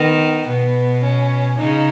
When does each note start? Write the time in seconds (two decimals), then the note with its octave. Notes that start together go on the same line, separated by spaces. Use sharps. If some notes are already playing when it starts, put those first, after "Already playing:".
Already playing: D#3 B3
0.48 B2 B3
1.03 C#4
1.59 C#3 D#4